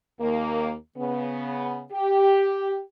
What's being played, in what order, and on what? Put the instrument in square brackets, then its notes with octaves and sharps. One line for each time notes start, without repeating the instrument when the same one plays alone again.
[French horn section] D#2 A#3
C#3 B3
G4